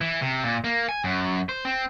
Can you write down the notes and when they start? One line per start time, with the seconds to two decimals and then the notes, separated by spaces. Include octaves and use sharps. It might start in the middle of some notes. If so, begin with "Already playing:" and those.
0.01 E3
0.22 C3
0.44 A#2
0.64 A#3
0.89 G#5
1.04 F#2
1.49 C5
1.65 C4